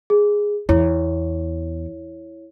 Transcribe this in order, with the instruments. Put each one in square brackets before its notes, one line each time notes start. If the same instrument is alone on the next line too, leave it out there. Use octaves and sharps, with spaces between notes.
[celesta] G#4
[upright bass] E2 [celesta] E4 C#5